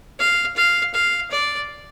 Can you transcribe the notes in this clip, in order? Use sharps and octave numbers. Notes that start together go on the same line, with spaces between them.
F5
F5
F5
D5